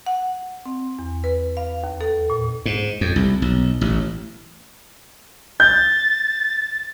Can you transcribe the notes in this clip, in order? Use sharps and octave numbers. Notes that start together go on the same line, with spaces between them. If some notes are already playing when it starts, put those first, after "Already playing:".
F#5
C4
E2
B4
F5
D#2
A4
A#2
G#2
F2
C2
B1
A1
G6 A6